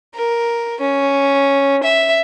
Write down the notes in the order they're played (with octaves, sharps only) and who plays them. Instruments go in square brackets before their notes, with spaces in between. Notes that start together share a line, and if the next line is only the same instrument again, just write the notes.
[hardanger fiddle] A#4
C#4
E5